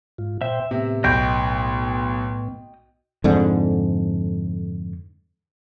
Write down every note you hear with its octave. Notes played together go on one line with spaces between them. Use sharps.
G#2 F4
A#2 C5 E5 G5
A2 C3 B3
B1 D#5 G5 G6
F2 G#2 D3